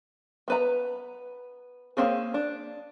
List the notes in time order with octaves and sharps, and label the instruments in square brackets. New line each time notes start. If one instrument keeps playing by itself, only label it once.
[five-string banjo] B3 B4 A#5
A#3 C4 C#4 G#4
D4